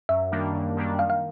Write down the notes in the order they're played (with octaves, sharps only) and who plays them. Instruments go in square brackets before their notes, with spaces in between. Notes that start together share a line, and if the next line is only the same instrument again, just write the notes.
[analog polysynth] F#2 [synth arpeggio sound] E5
[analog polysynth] D#3 G3 A#3 D4
F#2
D#3 G3 A#3 D4
[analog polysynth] D#3 [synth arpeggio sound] F5
[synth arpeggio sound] F5